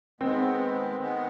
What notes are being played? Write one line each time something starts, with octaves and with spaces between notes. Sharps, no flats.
D#3 G#3 B3 C4
D#3 G#3 B3